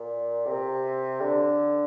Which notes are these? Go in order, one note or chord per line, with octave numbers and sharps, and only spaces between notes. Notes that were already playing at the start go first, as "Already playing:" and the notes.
Already playing: A#2
C3
D3